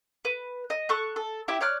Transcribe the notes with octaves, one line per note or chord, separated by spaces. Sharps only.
B4
D#5
A4 C#6 F#6
A4
E4 G4 E5
C#5 D5 F6 F#6